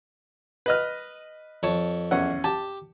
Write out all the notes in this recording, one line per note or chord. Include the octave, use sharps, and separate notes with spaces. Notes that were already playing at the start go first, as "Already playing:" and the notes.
B4 D#5 F6
F2 C#5 A5
E2 C#4 F#5
G4 A5